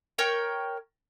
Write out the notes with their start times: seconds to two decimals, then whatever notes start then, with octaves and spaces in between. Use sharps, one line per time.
0.18 A#4 C#5 G5 C#6